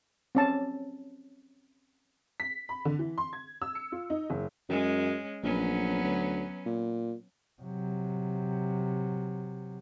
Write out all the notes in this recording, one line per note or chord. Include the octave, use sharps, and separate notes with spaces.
C4 C#4 A5
B6
B5
D3
E3
C6
G#6
E6
C#7
F4
D#4
F#1
F#2 G#3 C#4
A#1 F#3 B3 C#4
D2
A#2
C3 F#3